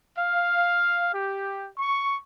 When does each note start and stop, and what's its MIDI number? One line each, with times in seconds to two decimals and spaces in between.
0.17 1.07 77
1.12 1.67 67
1.78 2.17 85